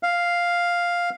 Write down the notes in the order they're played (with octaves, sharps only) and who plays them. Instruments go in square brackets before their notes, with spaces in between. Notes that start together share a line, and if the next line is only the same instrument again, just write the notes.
[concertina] F5